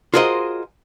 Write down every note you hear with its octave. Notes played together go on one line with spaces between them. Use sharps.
F4 F#4 G#4 A#4 C5 D#5